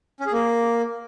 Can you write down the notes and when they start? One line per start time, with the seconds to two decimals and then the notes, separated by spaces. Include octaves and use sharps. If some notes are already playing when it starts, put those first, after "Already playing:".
0.20 C#4
0.26 G#4
0.32 A#3